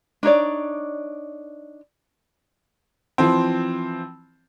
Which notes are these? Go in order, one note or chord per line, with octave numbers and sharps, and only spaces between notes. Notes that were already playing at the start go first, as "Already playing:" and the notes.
D4 D#4 C#5 D5
E3 F3 C4